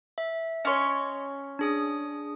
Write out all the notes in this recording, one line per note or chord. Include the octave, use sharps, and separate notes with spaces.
E5
C#4 C#5 D#5 C6
D4 G#4 D#6